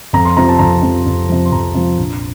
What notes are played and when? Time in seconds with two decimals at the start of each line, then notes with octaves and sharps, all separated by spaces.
0.13 F2 A#5
0.25 C6
0.37 C3 F3 A#5
0.49 A5
0.59 F2 A#5
0.82 C3 F3
1.06 F2
1.29 C3 F3
1.45 C6
1.52 F2 A#5
1.75 C3 F3
1.98 A#1